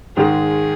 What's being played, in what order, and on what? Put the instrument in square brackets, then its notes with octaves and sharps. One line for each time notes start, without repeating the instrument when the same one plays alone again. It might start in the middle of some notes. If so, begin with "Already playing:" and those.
[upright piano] G#2 D#3 G#3 [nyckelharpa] G#4